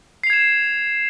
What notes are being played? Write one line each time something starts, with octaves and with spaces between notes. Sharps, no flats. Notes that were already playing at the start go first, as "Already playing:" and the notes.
G#6 C7 E7 F7